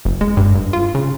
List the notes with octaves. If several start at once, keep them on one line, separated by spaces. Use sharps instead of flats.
F#1
G#3
G2
G1
F4
C#3